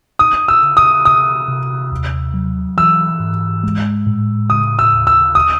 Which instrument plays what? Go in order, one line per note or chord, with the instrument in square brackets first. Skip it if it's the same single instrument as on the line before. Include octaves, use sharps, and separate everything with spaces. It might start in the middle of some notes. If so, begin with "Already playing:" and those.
[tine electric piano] D#4 [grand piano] D#6
[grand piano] E6
[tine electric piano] C#3
[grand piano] D#6
[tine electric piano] C3 [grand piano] D#6
[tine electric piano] C3
D#2
F#3
[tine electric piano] E3 [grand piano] E6
[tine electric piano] G#2
G#3
A2
[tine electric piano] C#3 [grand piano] D#6
[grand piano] E6
[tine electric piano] D#2
[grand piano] E6
D#6